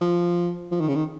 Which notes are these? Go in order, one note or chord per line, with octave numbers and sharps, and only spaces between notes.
F3
F3
D#3
C#3
D#3